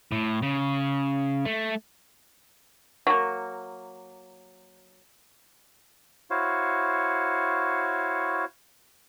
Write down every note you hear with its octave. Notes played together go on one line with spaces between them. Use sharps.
A2
C#3
A3
F#3 A#3
E4 F#4 C5 C#5 F5